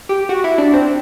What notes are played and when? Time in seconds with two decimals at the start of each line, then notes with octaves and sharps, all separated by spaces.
0.09 G4
0.29 F#4
0.44 E4
0.58 D4
0.74 C4